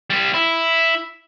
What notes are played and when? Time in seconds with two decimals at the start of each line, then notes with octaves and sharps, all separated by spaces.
0.10 G3 C4
0.34 E4